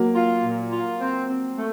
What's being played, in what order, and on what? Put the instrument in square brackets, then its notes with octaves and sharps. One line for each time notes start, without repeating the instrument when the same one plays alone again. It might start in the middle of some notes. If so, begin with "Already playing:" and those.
Already playing: [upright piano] F#3 A#3
[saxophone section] F4
A#2
F4
C4
C4
A3